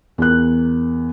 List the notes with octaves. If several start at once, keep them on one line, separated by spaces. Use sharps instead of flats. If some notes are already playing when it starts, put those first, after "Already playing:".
E2 A#4 F#6